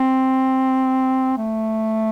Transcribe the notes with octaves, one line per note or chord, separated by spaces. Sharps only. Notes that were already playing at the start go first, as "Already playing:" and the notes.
Already playing: C4
A3